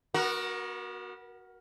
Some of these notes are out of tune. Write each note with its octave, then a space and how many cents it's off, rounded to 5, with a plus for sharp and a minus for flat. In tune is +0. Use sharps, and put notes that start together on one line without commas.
B3 -30 F#4 +0 A#4 +15